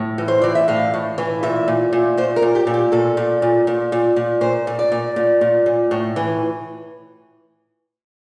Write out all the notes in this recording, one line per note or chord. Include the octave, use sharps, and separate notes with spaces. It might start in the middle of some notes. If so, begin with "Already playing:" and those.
Already playing: A2
E3
C5
E3 D5
E5
A2 F5
A2
E3
A#2 E5
A#2
A#2
A#2 C5
A#4
A#2
G4
A#2
G4
A#2 A4
A#2
A#2
A#2
A#2
A#2
A#2 C5
A#2
D5
A#2
A#2
A#2
A#2
A2
E3